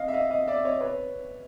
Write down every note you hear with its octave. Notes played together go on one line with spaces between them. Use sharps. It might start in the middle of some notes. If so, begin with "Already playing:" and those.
Already playing: D#5 F5
E5
D#5 F5
D#5 F5
D5 E5
C#5 D#5
B4 C#5